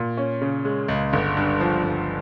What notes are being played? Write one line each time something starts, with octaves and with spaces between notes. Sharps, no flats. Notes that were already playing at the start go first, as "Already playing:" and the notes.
Already playing: A#2
C#4
C#3
G#3
C#2
G1
G2
F3
G1